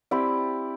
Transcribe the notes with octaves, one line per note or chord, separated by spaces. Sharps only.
C4 E4 G4 D5